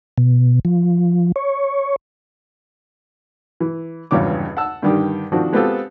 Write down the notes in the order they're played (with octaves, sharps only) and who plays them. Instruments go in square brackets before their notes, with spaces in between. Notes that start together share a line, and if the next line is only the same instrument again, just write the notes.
[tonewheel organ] B2
F3
C#5
[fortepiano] E3
G#1 E2 G2 C#3 C#5 D6
F#5 A5 E6
G2 D3 D#3 G3 G4
D#3 F3 C4 D4 F#4
G#3 B3 C4 F4 G4 A4